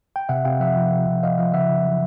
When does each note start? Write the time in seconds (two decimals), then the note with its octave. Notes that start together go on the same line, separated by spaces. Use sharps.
0.16 G5
0.29 C3 E5 F#5
0.45 C3 F5 G5
0.60 F3 E5 F#5
0.76 F3
0.92 C3
1.07 C3
1.23 F3 D#5 F5
1.38 F3 D#5 F5
1.54 C#3 E5 F#5
1.70 C#3
1.85 F#3